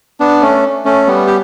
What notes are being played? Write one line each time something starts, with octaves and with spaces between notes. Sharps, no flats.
B3 D4
A3 C#4
A3 C#4
G3 B3
G4